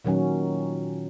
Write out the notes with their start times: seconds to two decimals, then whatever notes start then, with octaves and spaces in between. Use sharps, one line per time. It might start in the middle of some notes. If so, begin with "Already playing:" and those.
0.04 A#2 D#3 F#3 C#4